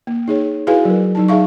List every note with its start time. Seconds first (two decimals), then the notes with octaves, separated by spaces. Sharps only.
0.07 A#3
0.28 D#4 G#4 C#5
0.67 E4 F#4 G#4 B4 F5 G#5
0.85 F#3 A#4
1.15 F#3 D#4 A5
1.28 D#4 G#4 E5 F5 C#6